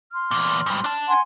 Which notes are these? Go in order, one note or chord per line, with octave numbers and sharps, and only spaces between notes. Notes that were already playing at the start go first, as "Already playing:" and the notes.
C6 F6
E2 A#2
G#2 G3
D4 A5
F#5 G#5 C6